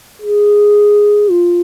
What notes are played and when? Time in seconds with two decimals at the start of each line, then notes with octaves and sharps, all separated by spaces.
0.22 G#4
1.30 F4